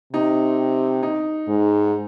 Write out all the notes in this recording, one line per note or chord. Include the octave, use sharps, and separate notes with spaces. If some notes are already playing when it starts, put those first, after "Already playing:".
C3 D#4
D#4
G#2